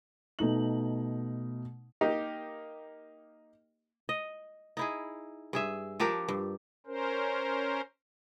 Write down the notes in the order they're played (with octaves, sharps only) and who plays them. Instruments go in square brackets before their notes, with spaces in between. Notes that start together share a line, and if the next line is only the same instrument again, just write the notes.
[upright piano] B2 A3 D#4 F#7
[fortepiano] A#3 D#4 G4
[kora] D#5
D#4 E4 G#4
G2 G#4 E5
F3 D4 G4 A#4
G2
[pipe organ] C#4 A#4 C5